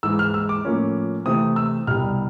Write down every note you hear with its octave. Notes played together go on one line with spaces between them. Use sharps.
G#2 E3 G#3 E6
F6
E6
D6
A2 F3 A#3 C#4
C3 E3 A3 C4 D#6
E6
C2 B2 G3 F6